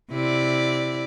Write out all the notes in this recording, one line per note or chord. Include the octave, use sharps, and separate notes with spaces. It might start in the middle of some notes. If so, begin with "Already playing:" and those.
C3 E4 D5